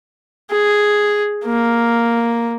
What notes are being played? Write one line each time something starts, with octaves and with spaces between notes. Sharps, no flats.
G#4
A#3